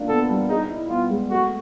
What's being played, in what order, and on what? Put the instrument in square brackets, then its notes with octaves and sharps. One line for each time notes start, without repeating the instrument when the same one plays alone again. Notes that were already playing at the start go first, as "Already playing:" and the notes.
Already playing: [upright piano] A#3 D4 F4
[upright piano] B3 [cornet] A4
[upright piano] G3
[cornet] D#4 [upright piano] G#4
[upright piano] E4
[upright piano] B3 [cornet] F4
[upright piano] G#3
[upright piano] A3 [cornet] F#4